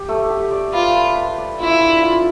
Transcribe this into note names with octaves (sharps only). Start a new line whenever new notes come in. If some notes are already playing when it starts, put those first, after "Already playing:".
Already playing: G4
A3
G4
D5
F4 B4
B4
B4
D5
E4 F4
D4
F4